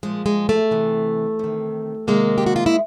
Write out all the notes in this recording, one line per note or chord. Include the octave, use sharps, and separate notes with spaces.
A#2 F3 G#3
G#3
A3
C3 E3
C3 D#3
C3 D#3 G#3 A#3
G4
F#4
F4
E4